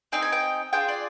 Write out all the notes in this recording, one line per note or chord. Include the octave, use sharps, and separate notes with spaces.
C4 D#4 G#4 G5
G#5
G5
D4 F4 G#4 G5
D5